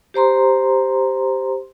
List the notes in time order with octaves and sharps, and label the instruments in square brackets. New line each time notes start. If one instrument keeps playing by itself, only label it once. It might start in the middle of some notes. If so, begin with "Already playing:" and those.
[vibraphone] G4 C5 A#5 C6